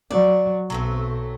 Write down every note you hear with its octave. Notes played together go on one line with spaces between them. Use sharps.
F#3 D5
B1 F#3 A3 C4